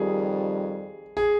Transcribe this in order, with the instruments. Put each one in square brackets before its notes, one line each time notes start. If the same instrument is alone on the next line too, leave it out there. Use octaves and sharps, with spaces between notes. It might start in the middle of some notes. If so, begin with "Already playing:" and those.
Already playing: [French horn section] F2 D#3 G3 [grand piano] G#4
[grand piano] G#4